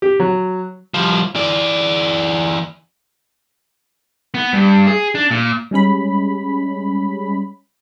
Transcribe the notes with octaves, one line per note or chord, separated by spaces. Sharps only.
G4
F#3
F3 G3
E3 D5
B3
G2
G#4
D4
A#2
G3 G#3 C#4 B5